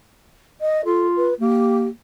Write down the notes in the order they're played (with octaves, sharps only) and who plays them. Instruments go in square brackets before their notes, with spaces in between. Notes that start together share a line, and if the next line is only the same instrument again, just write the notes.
[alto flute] D#5
[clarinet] F4 [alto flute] A4
[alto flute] B4
[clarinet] A#3 [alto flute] G4